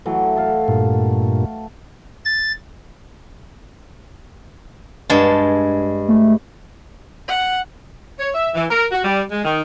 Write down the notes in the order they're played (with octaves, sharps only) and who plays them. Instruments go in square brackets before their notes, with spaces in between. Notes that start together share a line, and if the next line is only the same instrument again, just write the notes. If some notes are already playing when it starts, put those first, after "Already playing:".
[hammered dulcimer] E3 F#3 A3
A4 F5 F#5
[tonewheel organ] G2 A#2
[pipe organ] A6
[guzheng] G2 G#3 A5
[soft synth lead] A3
[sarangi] F#5
[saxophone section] C#5
E5
E3
A#4
F#4
G3
G#3
D#3